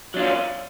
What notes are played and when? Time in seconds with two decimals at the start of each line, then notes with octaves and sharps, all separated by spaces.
0.14 F#3
0.17 D4
0.19 F4
0.22 C#4